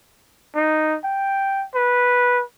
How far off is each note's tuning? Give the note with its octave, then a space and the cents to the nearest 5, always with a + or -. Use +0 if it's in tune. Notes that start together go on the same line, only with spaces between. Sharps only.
D#4 -5
G5 +0
B4 -10